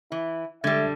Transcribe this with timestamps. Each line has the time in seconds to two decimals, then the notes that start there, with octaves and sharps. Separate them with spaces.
0.12 E3 E4
0.64 D3 G3 G#3 E5 G#6 A6